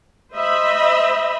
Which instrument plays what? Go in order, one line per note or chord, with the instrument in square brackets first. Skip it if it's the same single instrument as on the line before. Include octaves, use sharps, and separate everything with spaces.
[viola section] C5 D#5 E5 B5